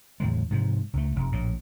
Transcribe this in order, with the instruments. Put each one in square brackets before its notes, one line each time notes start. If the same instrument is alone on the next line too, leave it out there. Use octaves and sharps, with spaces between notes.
[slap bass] E2 A2 D3 G#3
G#2 C3 F3
C#2 A3
F1
A#1 A2